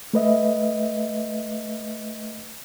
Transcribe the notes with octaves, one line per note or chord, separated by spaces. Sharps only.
A3 B4 D#5 E5